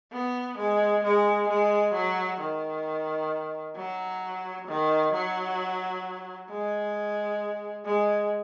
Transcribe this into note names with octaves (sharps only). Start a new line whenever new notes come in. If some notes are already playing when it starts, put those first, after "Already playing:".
B3
G#3
G#3
G#3
F#3
D#3
F#3
D#3
F#3
G#3
G#3